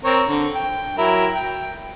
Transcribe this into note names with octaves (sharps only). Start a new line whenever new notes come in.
C4 A#4 C#5
D3
G5
F#3 E4 A#4
G5